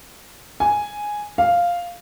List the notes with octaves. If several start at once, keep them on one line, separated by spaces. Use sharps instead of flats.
G#5
F5